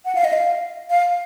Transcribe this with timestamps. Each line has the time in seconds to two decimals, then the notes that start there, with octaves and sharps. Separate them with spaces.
0.05 F#5
0.15 F5
0.24 D#5
0.33 F5
0.90 F5